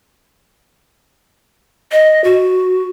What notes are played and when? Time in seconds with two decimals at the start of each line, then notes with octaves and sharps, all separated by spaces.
1.92 D#5
2.24 F#4